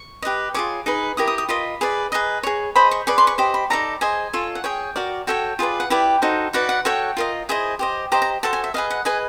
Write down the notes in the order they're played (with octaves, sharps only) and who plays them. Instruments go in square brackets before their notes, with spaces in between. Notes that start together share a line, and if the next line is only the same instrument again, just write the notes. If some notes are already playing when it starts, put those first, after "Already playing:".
Already playing: [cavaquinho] C#6
G4 B4 D#5
F4 G#4 C#5 D6
D#4 G#4 B4
E4 G4 A#4 D#6
D#6
D#6
F4 A#4 D#5 B5
G#4 B4 D5
G#4 B4 D#5 A#5
G#4 C#5
G#4 C5 D#5 B5
C#6
G#4 B4 D5 C#6
C6
C#6
G4 C5 D#5 B5
B5
D#4 F#4 A4 D5 A#5
G#4 C5 D#5 G#5
F4 A4 C#5
F#5
G#4 C#5 G5
F#4 A#4 D5
F#4 A4 C#5 G5
F4 G#4 B4 D5
F#5
E4 G4 B4 D5 G5
D#4 F#4 A4 C5
D#4 F#4 B4 D5 F#5
F#5
F#4 A4 C#5 G5
F4 A#4 D#5
E4 G#4 C5 D#5
G4 C5 D#5
G4 C5 D#5 A#5
A#5
F#4 A4 C5 A5
G#5
E5
G#4 B4 D#5 F5
F#5
G#4 B4 D#5 G#5